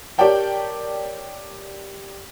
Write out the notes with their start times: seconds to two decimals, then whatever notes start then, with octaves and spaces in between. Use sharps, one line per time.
0.18 G4 A#4 C#5 D5 G5 A5